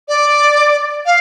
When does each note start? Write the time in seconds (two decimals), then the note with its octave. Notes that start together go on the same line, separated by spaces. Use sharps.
0.08 D5
1.05 F5